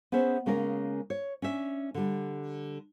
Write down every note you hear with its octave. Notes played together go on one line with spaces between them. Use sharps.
B3 C#4 G#4 C5 E5
C#3 G#3 A#3 C#4 A#4
C#5
C#4 D4 E5
D3 G3